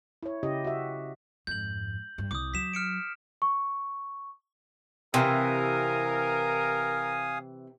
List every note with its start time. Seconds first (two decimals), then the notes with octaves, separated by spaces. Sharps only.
0.23 E4 C#5
0.43 C#3 E4 G4 D#5
0.64 F#4 E5
1.47 F2 G#2 G6 F#7
2.18 G2
2.31 C2 D6 D#6
2.54 F#3 B6 E7
2.73 F6 C#7 D7
3.42 C#6
5.14 C3 E3 A#4 F5 G#5 D#6